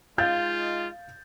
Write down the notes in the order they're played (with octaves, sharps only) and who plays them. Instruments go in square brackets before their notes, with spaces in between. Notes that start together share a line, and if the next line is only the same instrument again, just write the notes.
[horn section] G#3 D#4 F4 [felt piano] F5 G6 A6